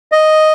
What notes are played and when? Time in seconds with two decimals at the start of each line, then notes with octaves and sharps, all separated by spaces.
0.12 D#5